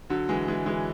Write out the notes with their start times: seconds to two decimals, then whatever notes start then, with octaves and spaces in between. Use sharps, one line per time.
0.10 D3 F#3
0.29 E3 G#3
0.48 E3 G#3
0.66 E3 G#3